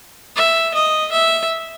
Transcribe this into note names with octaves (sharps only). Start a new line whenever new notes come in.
E5
D#5
E5